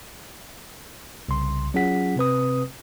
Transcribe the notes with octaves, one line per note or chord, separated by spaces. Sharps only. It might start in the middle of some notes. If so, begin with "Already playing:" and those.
C2 C#3 C6
F#3 C#4 F4 G#4 F#5 B6
C3 C4 B4 D#6